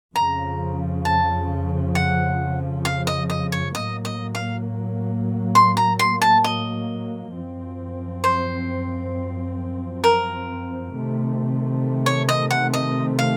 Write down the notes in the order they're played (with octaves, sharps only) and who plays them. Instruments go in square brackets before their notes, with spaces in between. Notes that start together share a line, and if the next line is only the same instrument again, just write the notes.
[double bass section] F2 C#3 F3 [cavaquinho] A#5
[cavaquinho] A5
F#5
F5
D#5
D#5
C#5
[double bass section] A2 F#3 A#3 [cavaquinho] D#5
[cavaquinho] D#5
F5
C6
A#5
C6
A5
D#5
[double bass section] F#2 F3 C4
[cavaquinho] C5
A#4
[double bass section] C3 D#3 A3
[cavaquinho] C#5
D#5
F#5
D#5
F5